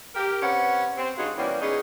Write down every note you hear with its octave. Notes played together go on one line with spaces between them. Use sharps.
G4 A#4
C3 C#4 B4 F#5
C4
G2 C#3 D#4 F4 F#4
B2 E3 G3 A#3 B3 C#4
B3 C#4 D#4 G#4